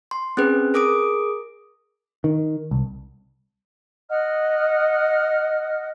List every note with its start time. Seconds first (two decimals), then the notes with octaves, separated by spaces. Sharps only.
0.11 C6
0.37 C4 C#4 G#4 B4
0.74 G#4 A#4 D6 D#6 D7
2.24 D#3
2.71 C2
4.10 D#5 F#5 F6